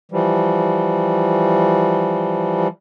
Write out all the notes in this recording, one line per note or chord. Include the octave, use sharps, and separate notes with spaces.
E3 F3 G3